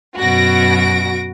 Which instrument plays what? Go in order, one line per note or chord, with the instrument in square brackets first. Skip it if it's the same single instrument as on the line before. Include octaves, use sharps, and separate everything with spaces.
[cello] F#2 B2 [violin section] F#4 A#6 D7